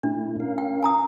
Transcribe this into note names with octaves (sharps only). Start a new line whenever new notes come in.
A#2 A3 D4 E4
C#4 A#4 F5
G5
G#5 A#5 D#6